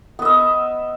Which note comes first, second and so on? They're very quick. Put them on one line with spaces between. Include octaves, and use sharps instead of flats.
B3 D#5 E5